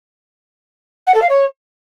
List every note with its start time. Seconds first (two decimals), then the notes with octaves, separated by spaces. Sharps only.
1.07 F#5
1.14 A4
1.22 F5
1.29 C#5